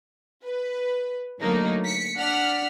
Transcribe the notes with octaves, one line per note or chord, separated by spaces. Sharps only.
B4
D3 F#3 A3 A#3 D#4
B6 C#7
D4 F#5 F6 B6